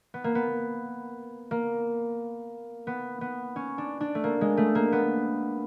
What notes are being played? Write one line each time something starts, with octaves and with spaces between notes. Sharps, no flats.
B3
A#3
B3
A#3
B3
B3
C#4
D4
D4
A3
A#3
G#3
A3
A#3
B3